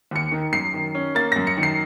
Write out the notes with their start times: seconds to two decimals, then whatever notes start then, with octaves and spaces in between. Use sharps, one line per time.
0.11 D#2 C#7
0.32 D#3
0.53 F#2 C7
0.74 D#3
0.95 C#4
1.15 A#3 A6
1.32 F#2 A#6
1.47 C#7
1.57 D#3
1.63 C7